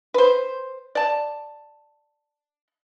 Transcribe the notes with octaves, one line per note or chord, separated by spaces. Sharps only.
B4 C5
D5 A5